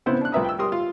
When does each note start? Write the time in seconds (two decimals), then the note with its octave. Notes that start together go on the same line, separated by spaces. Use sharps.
0.06 C#3 B3 C4 E4 C5
0.21 D4 F#6
0.32 C2 F4 B4 E5 A#5 D#6
0.45 G5 E6
0.58 G3 G4 A#4 C6 D#6
0.72 F4